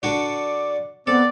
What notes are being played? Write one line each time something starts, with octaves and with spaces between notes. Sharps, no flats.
D3 D4 F#4 D5
B3 C4 A4 D5